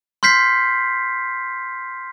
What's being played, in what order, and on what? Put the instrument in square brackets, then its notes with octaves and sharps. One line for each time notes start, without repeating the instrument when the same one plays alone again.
[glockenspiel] C6 F6 G6 B6 C7